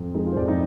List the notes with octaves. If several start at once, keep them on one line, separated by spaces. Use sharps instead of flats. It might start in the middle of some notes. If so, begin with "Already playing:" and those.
Already playing: F2
G#3 D#4
F4
C5
F2 D5
D#4